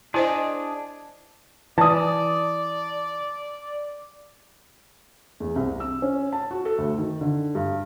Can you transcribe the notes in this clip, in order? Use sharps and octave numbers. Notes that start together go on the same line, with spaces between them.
D4 E4 G#4 C5 D#5
E3 D5 A5 D#6
E2
C2
E6
C#4
A5
F#4
A4
D2
D#3
D3
G2